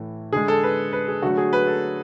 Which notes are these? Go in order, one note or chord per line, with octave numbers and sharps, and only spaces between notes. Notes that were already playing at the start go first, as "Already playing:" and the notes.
Already playing: A2 E3 A3
D3 G#3 G#4
A4
B4
B4
G#4
D3 F#3 A3 F#4
G#4
B4
A4